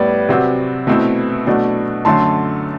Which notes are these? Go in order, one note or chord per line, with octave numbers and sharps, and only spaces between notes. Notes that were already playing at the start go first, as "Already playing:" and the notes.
Already playing: A2 G3 B3 B4 D5
C3 F#3 C4 F#4
B2 A3 C4 E4
B2 F#3 A3 D4 F#4
F#2 D3 A3 A5 C6